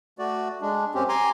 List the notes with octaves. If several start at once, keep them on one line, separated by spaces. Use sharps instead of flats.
A3 F#4 D5
G#3 D4
F#2 C4 C#4 G4
G#5 A#5 C6 D6